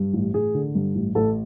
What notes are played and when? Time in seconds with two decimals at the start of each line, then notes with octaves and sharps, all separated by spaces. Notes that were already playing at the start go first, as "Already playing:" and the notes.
Already playing: G2
0.13 A1
0.34 A1 G#4
0.55 D3
0.75 G2
0.95 A1
1.15 A1 A4